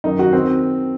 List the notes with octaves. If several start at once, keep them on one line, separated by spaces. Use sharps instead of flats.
F#2 D#3 D#4
F#4
D#3 C4